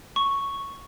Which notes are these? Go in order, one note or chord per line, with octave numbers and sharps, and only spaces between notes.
C#6